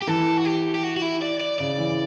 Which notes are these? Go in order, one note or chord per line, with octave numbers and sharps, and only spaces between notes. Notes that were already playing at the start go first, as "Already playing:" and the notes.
G4
E3 A4
F#4
G4
G4
F#4
F#4
E4
D5
D5
C#3 D5
E3